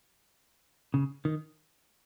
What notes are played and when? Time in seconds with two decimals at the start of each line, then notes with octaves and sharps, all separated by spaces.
0.94 C#3
1.25 D#3